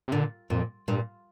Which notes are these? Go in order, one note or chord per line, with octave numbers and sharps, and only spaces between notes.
C3
A#2 D3
F2 A#2
G2 A#2